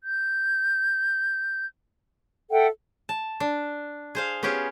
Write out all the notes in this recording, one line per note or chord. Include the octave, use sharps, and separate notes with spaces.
G6
A4 E5 F#5 G5
A5
D4
G#4 C5 F5
B3 C#4 F4 G4 G#4